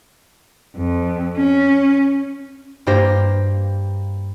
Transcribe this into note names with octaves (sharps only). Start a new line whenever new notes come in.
F2
C#4
G2 A#3 G4 C5 A#6